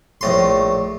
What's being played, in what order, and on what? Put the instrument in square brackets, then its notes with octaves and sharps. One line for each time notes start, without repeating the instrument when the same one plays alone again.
[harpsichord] A#1 A2 C6